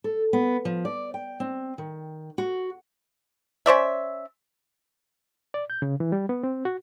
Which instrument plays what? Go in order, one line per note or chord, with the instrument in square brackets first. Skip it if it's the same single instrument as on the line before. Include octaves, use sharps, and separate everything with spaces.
[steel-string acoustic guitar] A4
B3
F3
D5
G5
C4
D#3
F#4
[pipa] C#4 C5 D5 E5
[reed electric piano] D5
G6
C#3
E3
G3
B3
C4
F#4